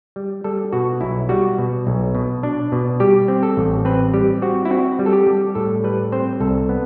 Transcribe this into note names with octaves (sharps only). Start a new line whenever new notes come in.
G3
G3 A4
B2 F#4
B1 E4
G3 F#4
B2
B1
B2
D4
B2
G3 G4
C4
A4
A1
C4 B4
G3 G4
C4 F#4
E4
C4 F#4
G3
A4
G4
G3
A2 A4
G3 B4
C4 C5
C2 A4
B3